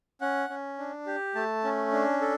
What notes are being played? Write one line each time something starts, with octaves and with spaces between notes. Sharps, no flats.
C#4 F#5
C#4
D4
G4
A3 A5
C#4
D4
A4